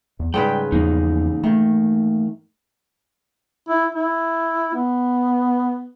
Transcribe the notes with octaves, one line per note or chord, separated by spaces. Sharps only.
E2
G#2 C#3 G3 B4 G5
E2 E3 F3 A#3 C#4 D#4
D#3 A3
E4
E4
B3